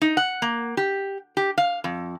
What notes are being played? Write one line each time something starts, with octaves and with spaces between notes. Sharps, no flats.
D#4
F#5
A#3
G4
G4
F5
F2